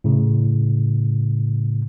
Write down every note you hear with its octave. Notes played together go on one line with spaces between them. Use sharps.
A2 C#3